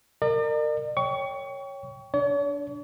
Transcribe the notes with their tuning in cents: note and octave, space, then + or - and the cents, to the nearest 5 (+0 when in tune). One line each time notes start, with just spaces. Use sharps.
A#4 -25 D5 +40
C#5 +0 G5 +0 C#6 +25
D4 -20 C#5 +45